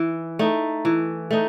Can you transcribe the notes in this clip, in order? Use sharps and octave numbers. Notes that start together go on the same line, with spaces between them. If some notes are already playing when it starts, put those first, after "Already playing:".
Already playing: E3
A3 D#4
E3
A3 D#4